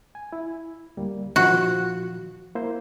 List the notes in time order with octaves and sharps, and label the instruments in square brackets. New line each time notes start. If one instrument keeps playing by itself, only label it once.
[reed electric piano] G#5
E4
D2 G3 A#3
[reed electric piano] A#2 D#3 F3 [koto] F#4
[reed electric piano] A#3 E4 C5